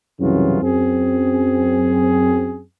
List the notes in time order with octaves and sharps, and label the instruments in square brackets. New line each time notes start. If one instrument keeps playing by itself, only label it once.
[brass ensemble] C2 F#2 C#3 E3 F#3 F4
F#2 C4 G#4